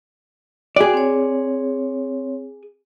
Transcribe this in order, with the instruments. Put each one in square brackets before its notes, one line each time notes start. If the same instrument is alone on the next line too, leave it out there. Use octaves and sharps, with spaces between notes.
[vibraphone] F#4 G5 [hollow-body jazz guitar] G#4 D5
[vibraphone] C4 C#5